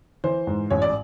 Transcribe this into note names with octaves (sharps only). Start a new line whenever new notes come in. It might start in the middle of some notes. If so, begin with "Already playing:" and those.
E3 C5
G#2
A1 C#5
D5